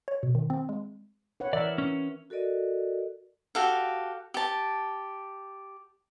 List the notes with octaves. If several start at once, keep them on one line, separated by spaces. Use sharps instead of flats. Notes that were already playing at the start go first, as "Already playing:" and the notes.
C#5
B2
D#3
C4
G#3
B4 C#5 F#5
E3 A#4 D5 E5
C#4
F#4 A4 A#4 D5 D#5
F#4 G4 A4 F5
G4 A5